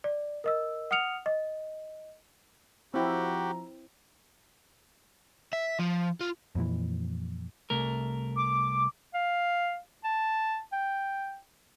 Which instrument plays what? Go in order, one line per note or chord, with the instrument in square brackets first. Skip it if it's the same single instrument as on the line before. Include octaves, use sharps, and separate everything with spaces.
[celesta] D5
A#4 D#5 E6
F#5 D#6 F6 C#7 F7
D#5
[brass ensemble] F3 A#5 [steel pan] C4 E4 [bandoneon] F#4 G4
[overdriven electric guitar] E5
F3
F4
[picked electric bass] F2 A#2 E3
[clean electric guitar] C2 A3 A#4
[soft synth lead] D6
[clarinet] F5
A5
G5